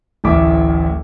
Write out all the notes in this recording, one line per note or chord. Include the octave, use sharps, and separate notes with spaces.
D1 A1 D2 E5 D6